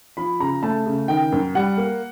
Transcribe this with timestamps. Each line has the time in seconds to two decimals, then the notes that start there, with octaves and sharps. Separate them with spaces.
0.17 F3 B5
0.40 C#3 A#5
0.63 A3 A5
0.86 C#3
1.08 D#3 G5
1.32 F#2
1.55 G3 F#5
1.77 A#3